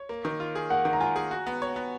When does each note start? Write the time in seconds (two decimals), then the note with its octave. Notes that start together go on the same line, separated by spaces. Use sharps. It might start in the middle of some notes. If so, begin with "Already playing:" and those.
Already playing: C#5
0.09 A#3
0.25 D#3
0.40 F4
0.55 G#4
0.70 A#3 F#5
0.85 D#3
0.93 A#5
1.00 F4 G#5
1.16 G#4
1.31 F#4
1.47 B3
1.62 C#5
1.76 B3